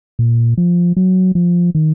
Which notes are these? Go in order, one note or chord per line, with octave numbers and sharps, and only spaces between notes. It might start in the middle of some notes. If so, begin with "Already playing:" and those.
A#2
F3
F#3
F3
D#3